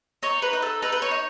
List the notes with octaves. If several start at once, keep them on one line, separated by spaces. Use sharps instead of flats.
D#4 C#5
B4
D#4
A4
D#4 B4
B4
C#5
D#4